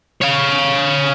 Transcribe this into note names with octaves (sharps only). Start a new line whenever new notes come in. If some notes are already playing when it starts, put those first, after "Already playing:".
C#5 F5